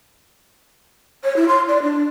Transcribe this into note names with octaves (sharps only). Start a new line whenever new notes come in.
C#5
E4
C6
D5
D4